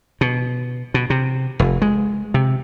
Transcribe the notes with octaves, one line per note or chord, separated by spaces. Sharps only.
B2
B2
C3
F1
G#3
C3